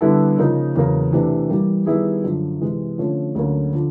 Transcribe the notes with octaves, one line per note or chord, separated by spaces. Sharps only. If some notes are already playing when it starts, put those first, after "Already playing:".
D3 G3 B3 E4 A4
C#3 F3 A#3 D#4
E2 C#3 F#3 A#3
C3 E3 A3 D4
E3 G3 A#3
D#3 G3 B3 E4 G#4
F#2 D3 F3
C3 E3 G#3
D3 F3 A3 C#4
D2 D3 F#3 A#3 C#4
D3 F3